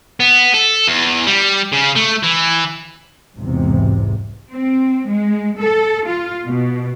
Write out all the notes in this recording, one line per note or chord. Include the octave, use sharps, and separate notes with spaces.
B3
A4
E2
G3
C#3
A3
E3
B1 E2 G#2 C3
C4
G#3
A4
F4
B2